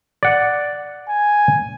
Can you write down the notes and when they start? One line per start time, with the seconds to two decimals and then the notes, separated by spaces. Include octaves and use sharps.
0.23 D5 F#5
1.09 G#5